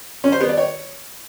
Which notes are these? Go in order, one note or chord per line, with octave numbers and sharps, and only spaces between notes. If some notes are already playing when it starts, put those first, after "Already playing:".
C#4
C5
B3
D5
C#5